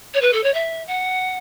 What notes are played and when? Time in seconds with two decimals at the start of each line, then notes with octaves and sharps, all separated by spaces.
0.14 C#5
0.21 B4
0.33 A4
0.43 C#5
0.54 E5
0.87 F#5